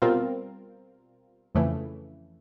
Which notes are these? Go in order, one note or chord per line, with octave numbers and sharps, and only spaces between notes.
B2 G3 C4 F4 A#4
F2 C#3 E3 A3